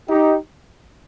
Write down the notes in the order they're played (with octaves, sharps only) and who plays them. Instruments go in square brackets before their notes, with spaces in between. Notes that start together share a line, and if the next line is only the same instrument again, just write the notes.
[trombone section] D#4 G4